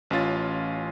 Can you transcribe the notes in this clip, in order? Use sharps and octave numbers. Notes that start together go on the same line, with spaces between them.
A1 C#4 F4 A6